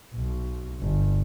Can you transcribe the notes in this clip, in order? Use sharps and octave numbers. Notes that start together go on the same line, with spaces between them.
B1
G1